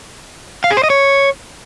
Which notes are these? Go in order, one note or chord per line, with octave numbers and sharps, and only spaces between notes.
F5
G#4
C5
D#5
C#5